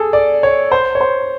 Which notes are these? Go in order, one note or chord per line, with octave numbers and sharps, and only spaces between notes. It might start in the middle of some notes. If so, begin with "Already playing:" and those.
Already playing: G#4 A4
D5
C#5
C5
C#5
C5